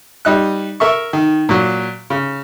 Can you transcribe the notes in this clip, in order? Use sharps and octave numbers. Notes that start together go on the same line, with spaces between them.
G3 D#4 F#6
A#4 E5 C#6
D#3
A#2 F#3
C#3